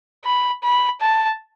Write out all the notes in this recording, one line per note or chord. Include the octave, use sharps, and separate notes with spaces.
B5
B5
A5